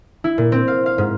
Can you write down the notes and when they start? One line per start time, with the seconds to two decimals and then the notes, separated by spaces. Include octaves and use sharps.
0.24 E4
0.38 A#2
0.52 C4
0.68 F5
0.86 F5
0.98 G#2